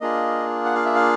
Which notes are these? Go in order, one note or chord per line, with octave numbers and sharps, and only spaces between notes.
A#3 D4 F4 G#4 D#5
F#5
F5
E5
F5